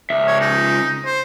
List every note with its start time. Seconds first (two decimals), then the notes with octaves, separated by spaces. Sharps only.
0.10 C#2 E5
0.27 C#5
0.41 D#4
1.05 C5